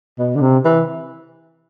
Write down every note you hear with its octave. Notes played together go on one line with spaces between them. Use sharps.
B2
D3
C3
E3